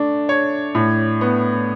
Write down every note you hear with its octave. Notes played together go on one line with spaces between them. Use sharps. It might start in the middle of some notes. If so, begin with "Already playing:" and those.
Already playing: A3 D4
C#5
A2
B3